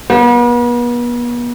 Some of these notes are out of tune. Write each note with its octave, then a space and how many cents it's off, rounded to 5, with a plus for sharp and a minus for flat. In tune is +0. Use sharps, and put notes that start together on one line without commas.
B3 -40